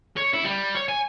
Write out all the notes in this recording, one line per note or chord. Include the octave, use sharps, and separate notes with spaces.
C#5
E4
G3
C#5
G#5